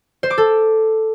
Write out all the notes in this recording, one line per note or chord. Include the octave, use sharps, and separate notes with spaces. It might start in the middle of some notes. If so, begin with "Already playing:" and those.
C5
D6
A4